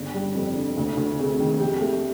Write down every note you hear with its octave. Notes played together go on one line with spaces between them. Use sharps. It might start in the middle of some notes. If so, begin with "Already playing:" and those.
Already playing: G1 C#3
G3
F2
D3
D2
D2
C3 G#4
D#3
F2 G4
A3